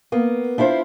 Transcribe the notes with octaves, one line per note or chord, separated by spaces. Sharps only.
A#3 B3
D4 E4 F4 C5